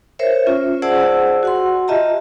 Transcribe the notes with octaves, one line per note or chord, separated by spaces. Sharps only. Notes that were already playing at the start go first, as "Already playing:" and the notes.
A#4 C5 C#5 E5
C#4 F4
G#4 C5 D5 F#5 A5 E6
F#4 F#5 C6
F4 G4 D#5 E5 A5 A#5